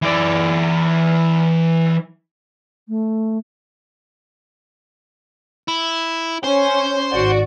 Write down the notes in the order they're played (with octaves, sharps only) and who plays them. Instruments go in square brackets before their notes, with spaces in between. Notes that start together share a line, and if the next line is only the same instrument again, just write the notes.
[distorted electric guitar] E3 D5
[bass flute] A3
[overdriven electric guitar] E4
[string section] C#4 [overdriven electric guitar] C5
[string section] G#1 F#4 D5